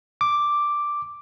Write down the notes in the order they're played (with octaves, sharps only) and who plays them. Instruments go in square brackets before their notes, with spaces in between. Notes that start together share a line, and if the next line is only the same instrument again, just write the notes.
[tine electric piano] D6